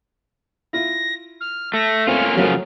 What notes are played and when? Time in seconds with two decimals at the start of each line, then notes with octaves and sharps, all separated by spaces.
0.73 E4 F4 A#6
1.40 F6
1.74 A3 A#6
2.07 A3 A#3 C4 C#4 F4 F6
2.37 C#3 F3 F#3 A3 A#3